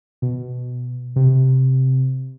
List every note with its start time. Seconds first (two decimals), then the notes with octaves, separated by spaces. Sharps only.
0.22 B2
1.16 C3